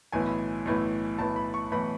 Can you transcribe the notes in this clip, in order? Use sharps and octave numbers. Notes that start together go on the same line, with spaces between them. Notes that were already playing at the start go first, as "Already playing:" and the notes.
B1 A2 E3 G#5
B1 A2 E3
B1 A2 E3 A5
B5
C#6
B1 A2 E3 B5